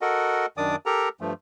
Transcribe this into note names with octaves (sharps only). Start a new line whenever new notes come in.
F#4 A4 A#4 D#5 F#5
F#2 D#3 D4 D5 D6 D#6
G4 A4 A#4 A#5
G2 F3 A3